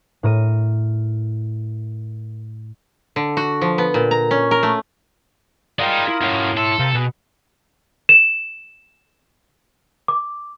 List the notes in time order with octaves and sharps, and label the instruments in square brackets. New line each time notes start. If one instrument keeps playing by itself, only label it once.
[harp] A2 A#4 D#7
[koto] D3
F#4
F3
B3
A#2
A#5
C#4
A#4
A3
[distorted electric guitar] G#3 D#4 [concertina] F4 A#4 D#6 [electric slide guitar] D5 F#5 G5
[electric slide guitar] E4
[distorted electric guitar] F#2 [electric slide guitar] E4 C#5
[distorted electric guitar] A4 [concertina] E5 A5 C6
[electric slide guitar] C3 [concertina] A#4 C5 F5
[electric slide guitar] B2 F#4 [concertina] G#4 B4 F#5
[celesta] E7
D6